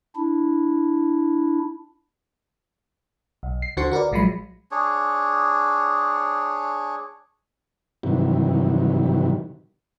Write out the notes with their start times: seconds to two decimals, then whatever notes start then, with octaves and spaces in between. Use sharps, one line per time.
0.16 D4 E4
3.43 B1
3.62 C7
3.77 D2 D3 F#4 C5 C#6 C#7
3.91 F#4 A#4 B4 D5
4.12 A#1 F3 F#3 G#3 B5
4.71 D4 G#4 C#5
8.03 G2 C3 D#3 E3 F#3